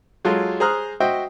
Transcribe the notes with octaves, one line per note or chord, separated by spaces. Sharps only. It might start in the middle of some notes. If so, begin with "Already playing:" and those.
F#3 G#3 F4 A4
G#4 C5 A#5 D#6 F6 F#6
F#4 C5 D#5 E5 G5